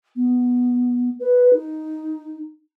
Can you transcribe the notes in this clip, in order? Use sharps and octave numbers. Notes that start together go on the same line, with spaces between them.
B3
B4
D#4